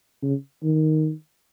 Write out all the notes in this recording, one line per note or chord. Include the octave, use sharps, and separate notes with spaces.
C#3
D#3